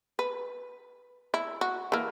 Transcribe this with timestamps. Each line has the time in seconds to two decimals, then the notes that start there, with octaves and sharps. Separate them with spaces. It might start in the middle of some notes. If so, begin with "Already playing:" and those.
0.19 B4
1.34 E4
1.61 F#4
1.92 E3 A#3